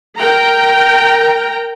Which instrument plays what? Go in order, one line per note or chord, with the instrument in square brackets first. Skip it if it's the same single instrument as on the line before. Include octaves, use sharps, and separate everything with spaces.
[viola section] A#4 G5 A#5